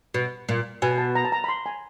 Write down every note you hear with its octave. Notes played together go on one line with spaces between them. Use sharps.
B2
A#2
B2 G#5
A5
A#5
A5
A#5
B5
C6
G#5